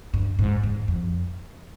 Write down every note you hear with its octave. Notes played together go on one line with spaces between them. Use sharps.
G2
G#2
G#2
F2